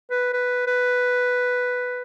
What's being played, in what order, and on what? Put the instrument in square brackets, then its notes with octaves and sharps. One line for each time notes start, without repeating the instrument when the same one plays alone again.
[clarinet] B4
B4
B4